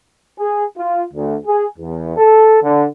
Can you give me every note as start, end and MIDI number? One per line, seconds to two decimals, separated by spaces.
0.38 0.64 68
0.77 1.03 65
1.12 1.35 38
1.46 1.66 68
1.79 2.16 40
2.17 2.58 69
2.63 2.85 50